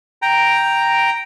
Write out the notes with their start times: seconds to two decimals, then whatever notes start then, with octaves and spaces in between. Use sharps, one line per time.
0.22 G5 A#5